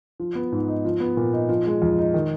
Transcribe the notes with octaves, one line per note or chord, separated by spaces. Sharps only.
F3
B3
G#2
D#4
F3
B3
A#2
D#4
F3
G#3
F2
D#4
D#3